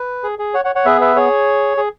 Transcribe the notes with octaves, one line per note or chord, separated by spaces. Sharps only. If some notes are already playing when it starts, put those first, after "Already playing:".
Already playing: B4
G#4
G#4
C#5 F#5
C#5 F#5
C#5 F#5
B3 G#4 B4 E5
B4 E5
G#4 C#5
G#4